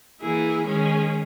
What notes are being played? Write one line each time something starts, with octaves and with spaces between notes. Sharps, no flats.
E3 A#3 E4 G#4
D#3 G#3 C#4 G#4